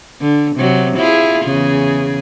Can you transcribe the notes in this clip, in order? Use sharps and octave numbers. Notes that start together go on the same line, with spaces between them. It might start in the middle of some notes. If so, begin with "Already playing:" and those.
D3
C3 F#3
E4 F4 G#4
E2 C#3 G#4